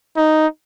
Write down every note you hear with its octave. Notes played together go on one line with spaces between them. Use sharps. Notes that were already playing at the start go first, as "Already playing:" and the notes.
D#4